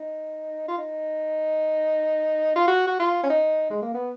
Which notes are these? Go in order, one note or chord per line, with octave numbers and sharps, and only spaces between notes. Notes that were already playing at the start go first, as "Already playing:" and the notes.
Already playing: D#4
F4
D#4
F4
F#4
F#4
F4
C#4
D#4
G#3
A#3
B3